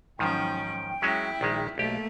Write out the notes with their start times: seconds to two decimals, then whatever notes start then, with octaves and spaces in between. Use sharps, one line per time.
0.19 G#2 D#3 F3 F#3 C#4 G5
1.02 F#3 G#3 C#4 E4
1.41 A#1 D#3 G#3
1.78 B1 A3 A#3 G4